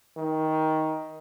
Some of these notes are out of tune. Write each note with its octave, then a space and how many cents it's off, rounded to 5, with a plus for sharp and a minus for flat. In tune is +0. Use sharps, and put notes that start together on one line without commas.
D#3 +15